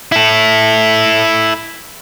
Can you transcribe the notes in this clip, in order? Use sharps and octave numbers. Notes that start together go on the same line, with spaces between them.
E4 A4